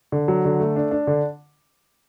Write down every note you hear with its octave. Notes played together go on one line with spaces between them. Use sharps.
D3
F#3
D3
A3
D4
D4
D3